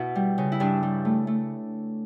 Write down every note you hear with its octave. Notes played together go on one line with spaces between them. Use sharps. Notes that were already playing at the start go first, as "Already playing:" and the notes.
Already playing: B2 E4
G3
C#3
E4
G2 D4
G3
A3
A3